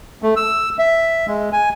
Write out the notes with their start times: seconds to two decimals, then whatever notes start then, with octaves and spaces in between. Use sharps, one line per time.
0.23 A3
0.36 E6
0.79 E5
1.28 G#3
1.53 G#5